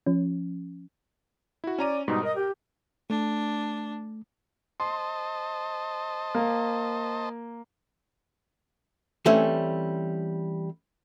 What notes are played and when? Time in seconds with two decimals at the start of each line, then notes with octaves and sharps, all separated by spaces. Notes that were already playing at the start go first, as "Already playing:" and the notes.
0.06 F3 C#4
1.64 E4 F#4
1.78 C#4 D5 A#5 D#7
2.08 G#2 B2 G3 D#4
2.23 A#4 D#5
2.35 G4
3.10 A3 D4
4.80 C5 D#5 A5 C6
6.35 A#3
9.26 E3 G3 A3 C4 C#4